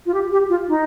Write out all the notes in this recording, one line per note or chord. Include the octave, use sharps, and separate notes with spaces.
F4
G4
G4
F4
D#4